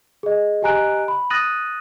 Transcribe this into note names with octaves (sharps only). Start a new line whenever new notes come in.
G#4 D#5
G4 D#5 G#5 A#5 F#6 D7
B5
D#6 F#6 A6 A#6 D#7 F#7